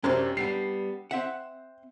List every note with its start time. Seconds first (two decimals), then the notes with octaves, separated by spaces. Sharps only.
0.04 F#2 C3 C#4 D4 C5
0.37 G3 B3 D4 C7
1.11 C4 E5 F#5